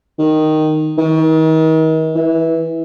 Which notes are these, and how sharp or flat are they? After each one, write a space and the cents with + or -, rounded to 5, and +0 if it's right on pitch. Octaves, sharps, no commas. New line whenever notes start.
D#3 -5
D#3 +40
E3 -15